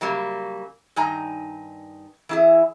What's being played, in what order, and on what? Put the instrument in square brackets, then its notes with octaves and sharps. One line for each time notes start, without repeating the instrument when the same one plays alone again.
[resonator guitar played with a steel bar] C#3 F#3 G3 A#3
G2 D#3 D#4 G#5 A#5
E3 E4 G#4